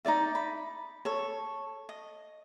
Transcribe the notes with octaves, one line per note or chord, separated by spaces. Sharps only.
D#4 F4 D5 E5
B5
A4 C#5
D#5